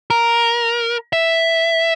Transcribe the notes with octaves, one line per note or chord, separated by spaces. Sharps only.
A#4
E5